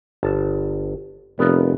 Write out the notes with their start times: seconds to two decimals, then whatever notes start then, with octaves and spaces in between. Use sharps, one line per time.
0.23 G1 A5
1.39 F1 B3 A#4 D5